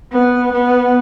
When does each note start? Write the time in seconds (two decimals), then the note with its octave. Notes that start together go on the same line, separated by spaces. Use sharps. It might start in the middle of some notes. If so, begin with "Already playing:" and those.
0.12 B3
0.53 B3